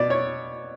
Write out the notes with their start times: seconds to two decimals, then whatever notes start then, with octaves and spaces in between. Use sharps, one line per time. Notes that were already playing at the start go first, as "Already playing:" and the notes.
Already playing: B2 D5
0.10 C#5